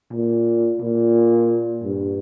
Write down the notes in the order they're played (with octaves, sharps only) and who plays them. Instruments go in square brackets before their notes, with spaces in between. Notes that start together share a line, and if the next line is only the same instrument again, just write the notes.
[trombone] A#2
A#2
G2